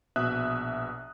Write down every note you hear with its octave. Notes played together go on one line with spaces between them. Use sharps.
A#1 B2 E5 D#6 F#6